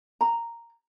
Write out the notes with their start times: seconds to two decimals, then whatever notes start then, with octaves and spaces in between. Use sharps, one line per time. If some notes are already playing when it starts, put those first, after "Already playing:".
0.21 A#5